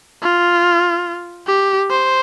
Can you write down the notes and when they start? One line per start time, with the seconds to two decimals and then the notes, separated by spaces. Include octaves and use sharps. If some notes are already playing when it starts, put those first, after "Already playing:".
0.22 F4
1.47 G4
1.90 C5